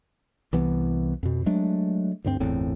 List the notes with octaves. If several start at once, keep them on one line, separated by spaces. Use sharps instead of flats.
C2 E3 B3
F2 B2
F#3 G#3 A3 D4
D2 G2 G3 C4
G1 E2 A2 C4